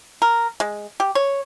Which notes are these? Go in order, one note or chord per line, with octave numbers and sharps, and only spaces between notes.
A#4
G#3
G4
C#5